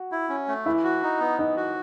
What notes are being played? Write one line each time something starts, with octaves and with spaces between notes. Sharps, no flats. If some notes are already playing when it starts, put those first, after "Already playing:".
Already playing: F#4
E4
C#4
A3
E3 E4 E5
F#4
D#4
B3
E3 D#4 D#5
F#4